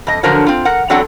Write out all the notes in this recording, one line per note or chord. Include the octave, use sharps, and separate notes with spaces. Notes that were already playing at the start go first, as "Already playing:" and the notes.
F2 D#5
D3 F3 F#3 A#4 C5 C#5
C4 F4
A#4 F#5
E2 F#3 C4 D4 A4 F#5